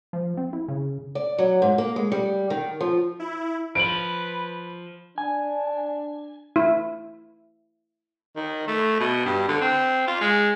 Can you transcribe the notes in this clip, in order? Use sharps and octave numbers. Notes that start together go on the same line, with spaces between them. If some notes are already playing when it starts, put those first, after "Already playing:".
F3
C4
E4
C#3
D5
F#3
G#2
A#3
G#3
G3
D#3
F3
E4
F3 B4 D7 F#7
D4 G#5
E4
D#3
A3
B2
G2
D3
C4
F4
G#3